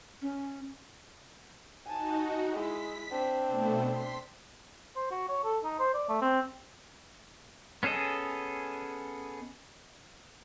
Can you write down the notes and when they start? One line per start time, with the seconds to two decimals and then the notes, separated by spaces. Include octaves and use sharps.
0.22 C#4
1.86 D#4 F#4 G#5 A5
2.53 G#3 E4 B6
3.11 C4 D4
3.48 B2 A3 B3
3.87 C6 B6
4.96 C5
5.11 F#4
5.29 C#5
5.44 A4
5.64 D#4
5.79 C5
5.94 D5
6.09 A3
6.22 C4
7.83 B3 C#4 G#4 A4 D#5